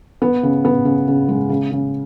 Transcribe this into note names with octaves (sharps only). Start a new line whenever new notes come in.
B3
C#3
B3
C#3
C#3
G#3
C#3
C#3